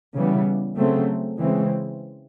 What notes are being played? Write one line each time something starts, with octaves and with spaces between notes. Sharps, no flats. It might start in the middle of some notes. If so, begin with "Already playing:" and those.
C#3 E3 G3 B3
C#3 F#3 A3 C4
C#3 E3 G#3 C4